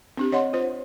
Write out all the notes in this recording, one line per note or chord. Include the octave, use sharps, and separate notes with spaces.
C4 D4 G4
D4 C#5 D#5 F#5 C6
F4 C5